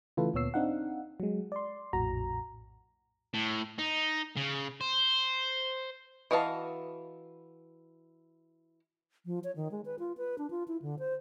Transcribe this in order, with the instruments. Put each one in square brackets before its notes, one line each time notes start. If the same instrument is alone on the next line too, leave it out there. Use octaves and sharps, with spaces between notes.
[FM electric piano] C#3 E3 A3 F4 A4 B4
D2 A#2 B3 C#5 E6 C7
C4 D4 D#4 F5 F#5
F#3 G#3
D5 C6
A#1 F2 A2 F#4 A#5
[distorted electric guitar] A2
D#4
C#3
C5
[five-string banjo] E3 F#4 D#5 F5 A5
[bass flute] F3
C#5
D#3
G#3
B4
F4
B4
D4
F4
E4
D3
C5